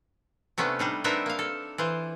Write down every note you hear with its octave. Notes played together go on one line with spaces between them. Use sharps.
C3 A3 B3 C#4 D4
G3 D4 D#4
B3 C4 D4 D#4 A#4 E5
A#3 F5
A4
E3 F4 C5